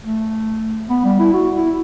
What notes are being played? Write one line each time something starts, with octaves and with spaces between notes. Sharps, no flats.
A3
B3
G3
E4
F#4
E4